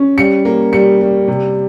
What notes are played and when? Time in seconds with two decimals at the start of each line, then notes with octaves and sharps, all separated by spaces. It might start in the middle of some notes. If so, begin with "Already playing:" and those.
Already playing: C#4
0.17 G3 C#7
0.45 A#3
0.73 G3 C#7
1.01 G3
1.28 C3